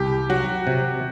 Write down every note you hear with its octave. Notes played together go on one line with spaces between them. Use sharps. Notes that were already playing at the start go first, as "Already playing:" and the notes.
Already playing: C2 G4
F#3 F#4
C3